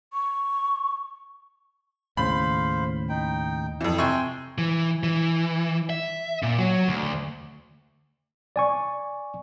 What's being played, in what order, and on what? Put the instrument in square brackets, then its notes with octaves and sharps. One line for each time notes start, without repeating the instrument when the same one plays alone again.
[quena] C#6
[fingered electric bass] D#2 A2 C#3 [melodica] C5 F5 [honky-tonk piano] B5
[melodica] D#4 G5
[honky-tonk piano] F2 E3
[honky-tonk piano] C3 C#6 G#6 [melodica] G5 G#5 C6
[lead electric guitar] E3
E3
E5
A#2
F#3
D2
[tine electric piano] D5 G#5 C#6